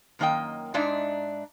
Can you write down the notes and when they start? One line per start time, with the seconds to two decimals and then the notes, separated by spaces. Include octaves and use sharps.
0.19 F#2 D#3 A#3 D4 D#5 G5
0.74 G#2 G#3 D4 D#4 D5 E5